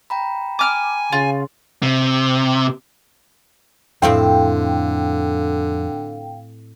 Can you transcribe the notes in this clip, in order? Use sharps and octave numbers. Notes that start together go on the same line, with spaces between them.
G5 A#5 B5
G#5 D6 F6
C#3 F4 C6
C3
F2 A2 D3 C4 C5 F5 G5